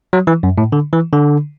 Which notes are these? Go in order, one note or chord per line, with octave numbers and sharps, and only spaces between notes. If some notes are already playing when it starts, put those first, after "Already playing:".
F#3
E3
F#2
A2
D3
E3
D3